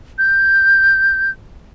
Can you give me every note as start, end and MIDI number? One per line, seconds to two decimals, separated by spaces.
0.18 1.30 91